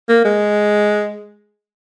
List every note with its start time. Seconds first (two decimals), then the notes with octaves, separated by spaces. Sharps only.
0.09 A#3
0.25 G#3